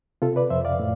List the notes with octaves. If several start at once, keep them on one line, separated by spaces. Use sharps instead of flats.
C3 F4 A4
B4 D5
F2 C5 E5
D5 F5
A2